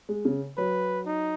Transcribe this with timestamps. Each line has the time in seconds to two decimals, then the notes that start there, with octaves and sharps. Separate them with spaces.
0.09 G#3
0.25 C#3
0.57 F#3 B4
1.06 D#4